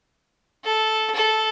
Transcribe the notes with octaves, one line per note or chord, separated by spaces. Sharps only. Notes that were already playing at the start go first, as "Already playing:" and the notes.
A4
A4